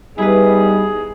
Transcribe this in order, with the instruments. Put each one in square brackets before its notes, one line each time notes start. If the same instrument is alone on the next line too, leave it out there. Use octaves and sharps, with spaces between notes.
[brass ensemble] G3 B3 D#4 [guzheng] E4 B4 [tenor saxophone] G#4